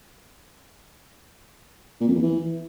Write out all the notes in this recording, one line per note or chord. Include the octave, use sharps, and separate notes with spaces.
A#2
F2
E2
E3